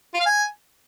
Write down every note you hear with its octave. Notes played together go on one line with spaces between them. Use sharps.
F4
F5
G#5